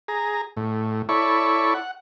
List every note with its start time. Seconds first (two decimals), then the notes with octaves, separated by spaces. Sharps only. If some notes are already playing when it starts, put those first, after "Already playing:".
0.08 G#4 A#5
0.57 A2
1.09 E4 A4 C#5 D5 B5 C#6
1.74 F#5